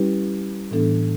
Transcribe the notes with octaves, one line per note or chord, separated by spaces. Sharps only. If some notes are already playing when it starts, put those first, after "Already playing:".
Already playing: G3 C#4 E4 G4 B4
A2 E3 B3 D4 A4